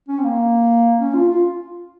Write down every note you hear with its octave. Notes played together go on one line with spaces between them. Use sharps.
C#4
C4
A#3
C#4
F4
F4